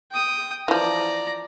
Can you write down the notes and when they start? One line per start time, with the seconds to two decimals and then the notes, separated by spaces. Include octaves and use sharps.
0.12 G5 D#6
0.68 E3 F3 D5 A#5